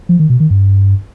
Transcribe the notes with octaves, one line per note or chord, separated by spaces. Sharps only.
F3
D#3
B2
D#3
G2